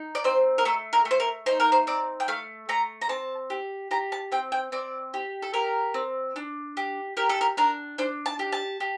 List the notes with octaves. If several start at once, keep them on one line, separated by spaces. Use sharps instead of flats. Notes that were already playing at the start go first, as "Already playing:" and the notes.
Already playing: D#4
D5
C4 C5
A#4
A3 A4
A#4
A3
C5
A#4
D#4 C5
A#4
C5
C4 D5
G5
A3 F5
A3 A#5
A#5
C4 A5
G4
G4 A#5
A5
C4 G5
G5
C4 D5
G4
A4
G4 A#4
C4
D4
G4
G4 A#4
A4
A#4
D4 A#4
D4 C5
A5
G4
A5
G4